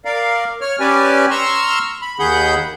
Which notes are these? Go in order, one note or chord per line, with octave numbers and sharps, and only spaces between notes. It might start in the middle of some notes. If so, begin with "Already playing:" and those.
A#4 D5 F5
C#5 F6
C#4 G4 B4 D5 G#5
A#5 C6 C#6 E6 F6
B5
D#2 D#3 G#4 F#5 B5 G6